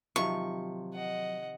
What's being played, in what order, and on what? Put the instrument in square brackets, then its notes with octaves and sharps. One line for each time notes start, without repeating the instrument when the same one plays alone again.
[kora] C3 D#3 F3 [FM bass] F#3 [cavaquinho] C#6
[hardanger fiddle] D#5 F#5